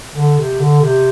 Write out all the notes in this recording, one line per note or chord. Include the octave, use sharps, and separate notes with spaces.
D3
C3
D3
C3